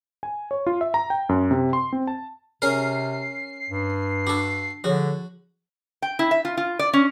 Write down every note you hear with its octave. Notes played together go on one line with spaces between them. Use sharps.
G#5
C#5
F4
E5
A#5
G5
F#2
C3
C6
C4
A5
C3 C#4 G#4 A#4 C7
G2
D4 F#4 A4 D6
D3 F3 F#4 G#4 C#5
G5
E4
E5
F4
F4
D5
C#4